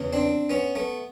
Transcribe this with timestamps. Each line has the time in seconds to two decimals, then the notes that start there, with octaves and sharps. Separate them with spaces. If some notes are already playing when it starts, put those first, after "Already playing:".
Already playing: E2 C#3 E3
0.13 C4 D4
0.50 B3 C#4
0.75 A3 B3